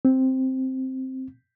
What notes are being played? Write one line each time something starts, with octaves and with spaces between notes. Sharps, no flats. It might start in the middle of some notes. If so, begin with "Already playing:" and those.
C4